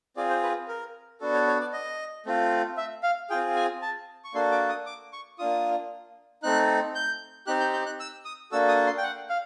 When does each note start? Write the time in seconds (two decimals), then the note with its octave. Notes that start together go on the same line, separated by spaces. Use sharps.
0.17 C4 F4 G#4 D5
0.30 C5
0.43 B4
0.68 A#4
1.20 B3 D4 F#4 A4
1.34 C#5
1.47 C#5
1.60 D5
1.73 D#5
2.26 A3 C4 F4
2.77 E5
3.03 F5
3.30 C4 F4 G#4 G5
3.56 G#5
3.82 A5
4.24 C#6
4.34 A#3 D4 F#4 A4 C6
4.52 D6
4.69 D#6
4.86 D6
5.13 C#6
5.39 A#3 D4 F4 D#6
6.43 A3 C4 D#4 F#6
6.95 G6
7.47 C4 D#4 G4 F#6
7.60 G6
7.73 G6
7.86 F#6
8.00 E6
8.25 D#6
8.52 A#3 D4 F#4 A4 E6
8.68 D#6
8.87 C6
8.98 G5
9.03 F#5
9.29 F5